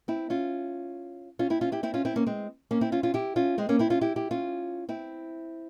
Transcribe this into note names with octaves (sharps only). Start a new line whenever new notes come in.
C4 E4
C#4 F4
C#4 F4
C4 E4
C#4 F4
E4 G4
C4 E4
C#4 F4
C4 E4
A#3 C#4
G#3 C4
A#3 C#4
C4 E4
C#4 F4
C#4 F4
E4 G4
C#4 F4
G#3 C4
A#3 C#4
C4 E4
C#4 F4
E4 G4
E4 G4
C#4 F4
C4 E4